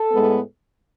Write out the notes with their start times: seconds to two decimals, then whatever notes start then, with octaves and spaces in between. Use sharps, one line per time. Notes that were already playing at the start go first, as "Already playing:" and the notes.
Already playing: A4
0.12 A2 G#3 B3